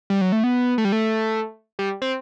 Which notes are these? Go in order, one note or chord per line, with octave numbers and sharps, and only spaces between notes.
G3
F#3
A3
B3
A3
G3
A3
G3
C4